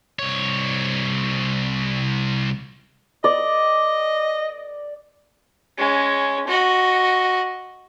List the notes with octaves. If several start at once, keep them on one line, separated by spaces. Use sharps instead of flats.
C2 C#5
D5 D#5
G#3 C#4
F#4 D#5